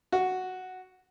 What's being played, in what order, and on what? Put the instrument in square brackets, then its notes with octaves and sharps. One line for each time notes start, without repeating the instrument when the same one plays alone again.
[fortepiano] F#4